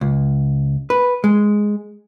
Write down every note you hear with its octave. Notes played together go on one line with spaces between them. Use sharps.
C#2
B4
G#3